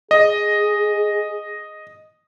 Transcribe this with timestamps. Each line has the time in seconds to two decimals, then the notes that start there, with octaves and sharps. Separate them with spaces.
0.11 G#4 D#5